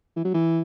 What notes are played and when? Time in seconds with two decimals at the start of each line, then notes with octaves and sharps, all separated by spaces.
0.16 E3
0.25 F#3
0.34 E3